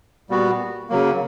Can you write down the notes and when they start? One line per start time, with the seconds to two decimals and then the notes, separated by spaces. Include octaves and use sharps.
0.30 A#2 G3 B3 F#4
0.90 C#3 F#3 A#3